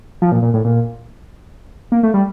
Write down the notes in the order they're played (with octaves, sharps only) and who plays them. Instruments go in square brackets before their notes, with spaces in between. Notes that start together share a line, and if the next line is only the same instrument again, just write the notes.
[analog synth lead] F3
A#2
A#2
A2
A#2
A#3
A3
G3